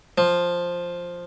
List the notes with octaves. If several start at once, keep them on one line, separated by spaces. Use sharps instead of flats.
F3